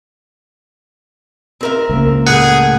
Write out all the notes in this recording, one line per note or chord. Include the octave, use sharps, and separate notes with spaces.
C4 A#4 E5
C#2 A#3
A2 G#4 F#5